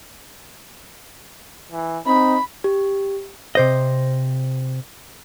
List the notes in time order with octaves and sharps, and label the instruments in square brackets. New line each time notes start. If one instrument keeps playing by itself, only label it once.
[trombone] E3
[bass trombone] C4 [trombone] D#4 [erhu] B5
[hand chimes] G4
[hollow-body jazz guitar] C3 C5 D#5